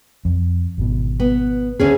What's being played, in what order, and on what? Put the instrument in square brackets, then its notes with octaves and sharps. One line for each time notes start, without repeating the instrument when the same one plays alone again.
[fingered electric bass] F2
G#1 B2
[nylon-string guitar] B3
D2 C#4 G#4